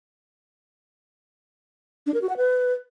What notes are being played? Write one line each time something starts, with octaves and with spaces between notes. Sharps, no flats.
D4
A#4
F#4
F#5
B4